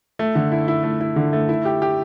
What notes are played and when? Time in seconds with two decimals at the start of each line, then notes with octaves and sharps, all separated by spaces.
0.19 A3
0.35 D3
0.52 E4
0.68 E4
0.84 A3
1.01 E4
1.16 D3
1.33 A3
1.49 E4
1.65 G4
1.82 G4